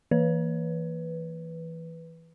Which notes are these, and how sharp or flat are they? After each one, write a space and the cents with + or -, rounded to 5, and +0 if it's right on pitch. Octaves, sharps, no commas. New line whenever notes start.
E3 +0 B4 +0